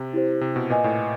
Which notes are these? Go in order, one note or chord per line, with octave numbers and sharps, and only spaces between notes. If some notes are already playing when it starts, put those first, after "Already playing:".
Already playing: C3
E4 G4 C5
C3
B2
A#2 B4 D#5 G#5
A2